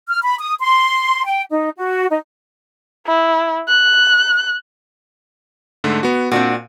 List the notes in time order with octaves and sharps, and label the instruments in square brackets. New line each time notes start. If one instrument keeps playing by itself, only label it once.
[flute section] F6
B5
D#6
C6
G5
D#4
F#4
D#4
[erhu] E4
F#6
[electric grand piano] G#2 D3 A3
B3 F#4
[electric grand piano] A#2 [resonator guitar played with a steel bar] C4 D4 F#4